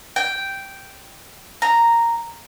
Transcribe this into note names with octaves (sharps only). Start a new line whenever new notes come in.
G5
A#5